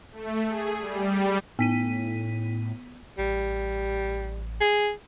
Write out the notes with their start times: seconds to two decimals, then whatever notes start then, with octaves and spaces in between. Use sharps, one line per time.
0.12 A3
0.48 G#4
0.78 G3
1.59 A2 B3 B6 D#7
3.18 A1 G3
4.61 G#4